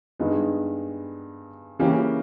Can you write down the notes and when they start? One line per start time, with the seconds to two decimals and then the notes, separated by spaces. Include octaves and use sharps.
0.19 G2 D#3 G#3 B3 D#4
1.79 C#3 E3 A#3 C#4 G4